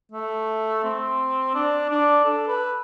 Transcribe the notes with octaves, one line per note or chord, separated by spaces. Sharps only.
A3
C4
D4
D4
A4
B4